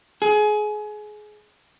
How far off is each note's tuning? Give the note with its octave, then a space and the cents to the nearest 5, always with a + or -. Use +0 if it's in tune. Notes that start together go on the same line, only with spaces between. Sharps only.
G#4 +25